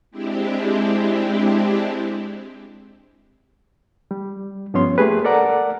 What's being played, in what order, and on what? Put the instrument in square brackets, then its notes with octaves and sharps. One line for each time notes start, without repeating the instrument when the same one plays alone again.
[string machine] G#3 C4 D4 E4 G4
[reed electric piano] G3
G2 F3 B3 C#4 C#5 C6
A3 A#3 G4 G#4 B4
A4 A#4 D5 F#5 A#5